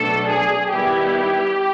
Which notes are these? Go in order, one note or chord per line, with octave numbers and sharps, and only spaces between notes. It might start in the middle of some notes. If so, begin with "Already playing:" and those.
Already playing: B2 F#3 A3 D4 A4
G#4
D#3 G3 B3 E4 G4